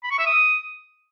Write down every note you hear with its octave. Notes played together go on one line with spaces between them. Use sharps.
B5
C#6
E5
D#6